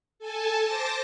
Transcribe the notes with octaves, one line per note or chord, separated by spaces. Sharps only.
A4 G#5 A5
C5 A5 D6 A6 A#6